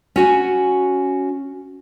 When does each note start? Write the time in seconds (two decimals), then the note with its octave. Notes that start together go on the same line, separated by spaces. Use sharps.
0.16 C#4 F#4 G#5